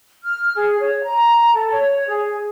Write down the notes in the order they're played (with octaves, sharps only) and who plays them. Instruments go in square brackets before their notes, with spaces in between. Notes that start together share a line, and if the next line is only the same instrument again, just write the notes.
[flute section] F6
G#4
C#5
A#5
A4
C#5
G#4